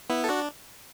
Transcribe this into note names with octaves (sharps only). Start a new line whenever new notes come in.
B3 E4
A4
D4 F#4